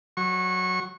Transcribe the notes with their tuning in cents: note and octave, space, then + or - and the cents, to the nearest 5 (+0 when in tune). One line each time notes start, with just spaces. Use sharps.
F#3 +0 C#6 -25